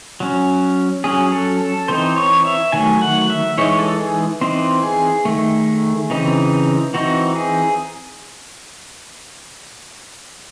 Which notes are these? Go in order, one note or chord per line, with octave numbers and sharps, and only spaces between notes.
F#3 C#4
F#3 C#4 G#4
A4
A4
E3 C4 D#4 C5
C#5
E5
D#3 F#3 A3 G#5
F#5
E5
E3 G#3 D#4 C#5
A4
G#4
E3 C4 D#4 C5
G#4
D#3 F#3 A3
C#3 E3 C4 D#4
E3 C4 D#4 F#4
G#4